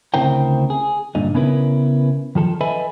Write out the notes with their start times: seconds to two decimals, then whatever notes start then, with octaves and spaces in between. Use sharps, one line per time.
0.14 D2 C#3 C4 E4 A#4 G5
0.70 G#4
1.15 G2 A#2 D3 D#4
1.34 C#3 B3 C#4 E4 A#4 B4
2.35 D#3 F3 A4
2.61 A4 B4 D#5 E5 G#5 B5